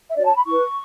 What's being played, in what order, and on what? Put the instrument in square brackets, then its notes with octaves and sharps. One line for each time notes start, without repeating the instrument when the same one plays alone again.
[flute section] E5
D4 F#4 C#5 D5
A5
B5
E4 B4 C#6